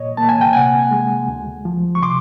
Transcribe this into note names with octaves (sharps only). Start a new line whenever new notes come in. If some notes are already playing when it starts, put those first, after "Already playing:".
Already playing: A#2 C#5 D#5
A#3 A5
G#5
G5
C3 F#5 G#5
G#3
D2
F3
C#6
C3 C6 D6